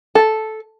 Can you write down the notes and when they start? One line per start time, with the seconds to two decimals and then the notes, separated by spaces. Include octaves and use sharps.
0.15 A4